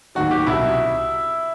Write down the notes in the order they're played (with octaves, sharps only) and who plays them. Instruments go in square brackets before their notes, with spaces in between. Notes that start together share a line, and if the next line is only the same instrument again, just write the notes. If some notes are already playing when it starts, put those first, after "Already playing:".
[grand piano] D#2 D#3 F#3 F#4
G4
C2 B2 F#3 E4